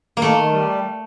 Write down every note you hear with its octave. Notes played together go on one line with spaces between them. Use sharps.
A#3
D#3 A3
D#3
G3